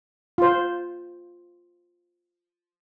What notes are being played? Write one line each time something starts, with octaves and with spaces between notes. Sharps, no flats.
F4 C5